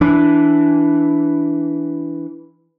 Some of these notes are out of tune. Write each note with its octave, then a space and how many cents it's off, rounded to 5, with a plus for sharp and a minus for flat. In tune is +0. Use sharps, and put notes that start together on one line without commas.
E3 +0 D4 -15